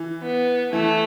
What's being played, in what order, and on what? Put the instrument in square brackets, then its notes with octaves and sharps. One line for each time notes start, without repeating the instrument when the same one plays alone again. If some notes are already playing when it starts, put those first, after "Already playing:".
Already playing: [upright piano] E3
[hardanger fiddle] B3
[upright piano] E3 [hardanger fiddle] A3